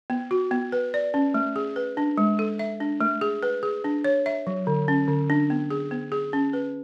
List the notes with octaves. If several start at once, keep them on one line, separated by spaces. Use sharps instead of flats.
B3
F#4
B3
B4
D5
C#4
A3
G#4
B4
D4
G#3
A4
E5
D4
A3
G#4
B4
G#4
D4
C#5
E5
F#3
D3
C#4
D3
D4
B3
G#4
B3
G#4
C#4
B4